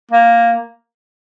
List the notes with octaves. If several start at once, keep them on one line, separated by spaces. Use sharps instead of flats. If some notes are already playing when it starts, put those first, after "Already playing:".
A#3